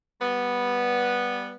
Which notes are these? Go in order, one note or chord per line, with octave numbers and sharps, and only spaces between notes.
G3 B3